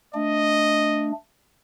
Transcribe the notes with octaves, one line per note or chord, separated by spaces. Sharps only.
A3 D4 D#5